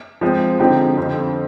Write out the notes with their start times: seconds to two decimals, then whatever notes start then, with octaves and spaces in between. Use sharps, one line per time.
0.21 F3 G#3 C4
0.59 D3 F3 C4 D#4 G4
0.97 F2 D3 F3 C4 F4